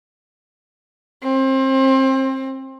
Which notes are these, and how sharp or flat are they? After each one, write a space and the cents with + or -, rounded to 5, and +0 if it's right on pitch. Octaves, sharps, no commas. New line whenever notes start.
C4 +25